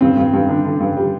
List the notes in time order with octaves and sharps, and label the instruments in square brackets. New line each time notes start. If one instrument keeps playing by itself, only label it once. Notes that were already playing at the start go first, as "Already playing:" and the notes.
[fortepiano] G2 C4
G2
G2
D3
D3
G2
G3